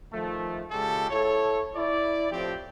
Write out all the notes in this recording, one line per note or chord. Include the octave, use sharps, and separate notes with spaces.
D#3 F3 A3
C#3 G#3 F4 G4 A4
E4 A4 C#5
E4 D5
A2 F3 C4 G4